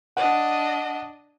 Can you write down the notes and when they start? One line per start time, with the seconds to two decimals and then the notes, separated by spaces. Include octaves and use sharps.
0.17 D4 D#5 F#5